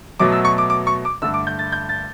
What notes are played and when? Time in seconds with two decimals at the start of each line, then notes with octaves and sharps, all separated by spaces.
0.19 B2 F#3 A3 D6
0.32 E6
0.45 C#6
0.58 D6
0.70 D6
0.87 C#6
1.05 D6
1.22 G2 D3 A3 E6
1.34 D6
1.47 G6
1.59 A6
1.72 G6
1.89 A6